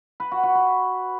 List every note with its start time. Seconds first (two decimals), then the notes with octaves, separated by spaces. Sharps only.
0.20 B4
0.32 F#4
0.43 F#4
0.55 B4